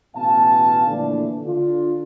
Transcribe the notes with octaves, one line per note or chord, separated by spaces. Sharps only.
A1 B2 B3 F5 G#5 A5
A#2 D3 E3 F3 A3 D4
D3 D4 F4